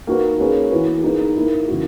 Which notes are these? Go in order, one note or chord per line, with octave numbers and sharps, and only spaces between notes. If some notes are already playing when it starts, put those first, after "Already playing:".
A#3 D#4 F#4 B4
A#3 C#4 G#4 B4
E3 B3 F#4 B4
A#3 D#4 G#4 B4
A#3 E4 A#4
C#3 E3 A#3 C#4 F#4